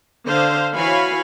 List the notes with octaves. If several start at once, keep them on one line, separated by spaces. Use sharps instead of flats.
D3 C5 F5
E3 F#4 C#5 F5 G#5 B5